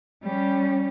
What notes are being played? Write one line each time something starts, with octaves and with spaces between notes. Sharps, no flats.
G3 C#4